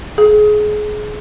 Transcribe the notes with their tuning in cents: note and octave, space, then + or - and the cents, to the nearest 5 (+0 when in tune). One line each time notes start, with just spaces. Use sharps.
G#4 +25